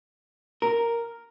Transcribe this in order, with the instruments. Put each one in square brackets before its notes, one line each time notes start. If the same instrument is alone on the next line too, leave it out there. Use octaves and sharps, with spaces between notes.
[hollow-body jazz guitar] A#4